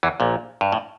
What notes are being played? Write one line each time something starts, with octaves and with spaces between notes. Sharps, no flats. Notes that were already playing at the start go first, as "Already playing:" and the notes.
E2 E3
A#1 A#2
G2
A2